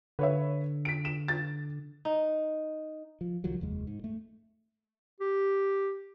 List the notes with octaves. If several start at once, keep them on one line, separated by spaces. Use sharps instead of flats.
D3 B4 C#5 E5
B6 D7
E7
A6
D#4
F3
C2 D#3 F3 F#3
F1 D#2 G#3
G#2
A3
G4